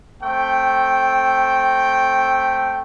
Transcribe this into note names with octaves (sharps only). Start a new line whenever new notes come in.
A3 C4 G5